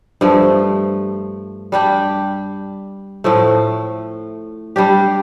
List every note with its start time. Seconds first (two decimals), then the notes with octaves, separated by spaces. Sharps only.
0.21 G2 F3 A3
1.72 G3 D4 G4
3.24 A2 F3 A3
4.76 G3 D4 G4